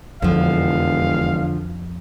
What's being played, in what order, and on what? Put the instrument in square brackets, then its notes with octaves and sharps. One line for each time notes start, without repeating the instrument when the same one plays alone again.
[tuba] E1 [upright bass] F2 [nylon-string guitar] D3 F3 [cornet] F5